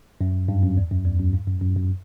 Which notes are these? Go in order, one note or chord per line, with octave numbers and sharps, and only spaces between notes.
F#2
G2
F#2
E2
F#2
E2
F#2
G2
F#2
F#2
F#2